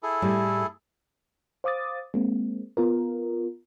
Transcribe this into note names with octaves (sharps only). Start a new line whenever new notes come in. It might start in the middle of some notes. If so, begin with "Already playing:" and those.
E4 G#4 A4
A2 G3 A3
C5 F5 D6 D#6 A6
G#3 A#3 C4
B3 F4 A#4